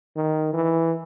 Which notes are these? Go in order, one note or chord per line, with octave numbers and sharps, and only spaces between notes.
D#3
E3